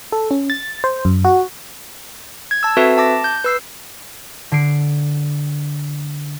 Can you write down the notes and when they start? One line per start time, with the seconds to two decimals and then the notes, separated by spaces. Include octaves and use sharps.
0.12 A4
0.31 C#4
0.50 A6
0.84 C5
1.05 F#2
1.24 F#4
2.51 G#6
2.63 A5 E6
2.77 C4 F#4 A4 B4 E5
2.98 A5 D6 A#6
3.24 G6
3.45 B4 E6 C7
4.52 D3 C7 D7